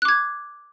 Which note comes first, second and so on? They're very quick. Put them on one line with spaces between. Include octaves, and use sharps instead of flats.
F#6 D6 G#6